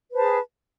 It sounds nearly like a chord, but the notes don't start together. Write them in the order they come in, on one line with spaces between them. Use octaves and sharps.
B4 C5 A5 G#4